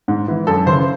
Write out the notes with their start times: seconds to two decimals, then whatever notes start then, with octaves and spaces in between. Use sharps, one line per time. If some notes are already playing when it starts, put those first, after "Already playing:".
0.08 G#2
0.28 E3
0.47 F#2 A4
0.66 C#3 E3 C5